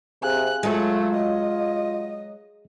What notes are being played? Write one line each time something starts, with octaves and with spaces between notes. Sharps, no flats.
C3 G#4 F5 G#5 F#6
F#3 G#3 A3 F4
D#5